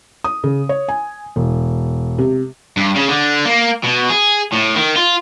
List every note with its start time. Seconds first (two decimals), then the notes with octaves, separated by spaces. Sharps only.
0.24 D#6
0.44 C#3
0.69 C#5
0.88 G#5
1.36 E1
2.18 C3
2.77 G2
2.95 C#3
3.08 D3
3.45 A#3
3.84 B2
4.10 G#4
4.52 A2
4.75 D#3
4.96 F4